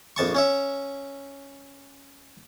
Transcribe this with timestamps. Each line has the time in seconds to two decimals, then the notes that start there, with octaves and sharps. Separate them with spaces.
0.16 A#1 F2 A5 C#6
0.35 C#4 C#5 E5